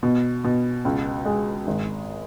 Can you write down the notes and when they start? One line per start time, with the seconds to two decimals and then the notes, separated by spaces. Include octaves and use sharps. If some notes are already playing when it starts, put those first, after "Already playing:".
0.03 B2
0.44 B2
0.85 C#2
1.25 G#3
1.67 G#1